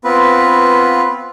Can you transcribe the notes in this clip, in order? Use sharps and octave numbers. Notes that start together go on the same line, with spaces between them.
B3 C4 F4 B4